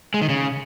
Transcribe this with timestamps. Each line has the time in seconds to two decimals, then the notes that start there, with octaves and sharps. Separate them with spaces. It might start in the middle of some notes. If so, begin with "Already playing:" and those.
0.14 G#3
0.22 D#3
0.29 C#3